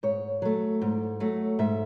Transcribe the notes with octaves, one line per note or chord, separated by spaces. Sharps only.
G#2 C#5
F#3 A3
G#2
F#3 A3
G#2 E5